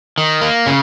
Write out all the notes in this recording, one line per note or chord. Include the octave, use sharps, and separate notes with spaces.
D#3
A#3
C#3